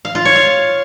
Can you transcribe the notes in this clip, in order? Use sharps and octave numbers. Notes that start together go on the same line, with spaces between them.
F5
F4
C#5
F5